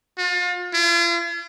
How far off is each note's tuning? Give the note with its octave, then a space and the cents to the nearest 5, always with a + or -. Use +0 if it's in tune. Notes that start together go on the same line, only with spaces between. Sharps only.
F4 +35
F4 -40